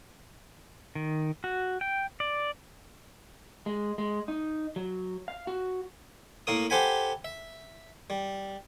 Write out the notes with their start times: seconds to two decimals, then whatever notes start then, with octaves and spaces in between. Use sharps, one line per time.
0.95 D#3
1.44 F#4
1.81 G5
2.20 D5
3.66 G#3
3.98 G#3
4.28 D#4
4.76 F#3
5.28 F5
5.47 F#4
6.47 A2 A#3 A#4 D#6
6.70 G4 A4 C5 F#5 G#5 B5
7.25 E5
8.10 G3